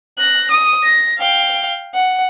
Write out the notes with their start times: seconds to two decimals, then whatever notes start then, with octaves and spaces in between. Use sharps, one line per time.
0.19 F#6 A#6
0.51 D#6
0.83 A#6
1.18 F5 G5
1.94 F#5